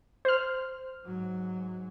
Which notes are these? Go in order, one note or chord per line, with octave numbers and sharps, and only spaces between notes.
C5 F6
G#2 F#3